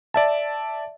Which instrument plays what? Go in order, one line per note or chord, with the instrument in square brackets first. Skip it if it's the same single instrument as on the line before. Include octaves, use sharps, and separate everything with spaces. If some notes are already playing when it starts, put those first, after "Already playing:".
[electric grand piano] D5 E5 A5